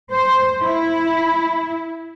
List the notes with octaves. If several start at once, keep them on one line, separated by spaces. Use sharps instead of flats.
C5
E4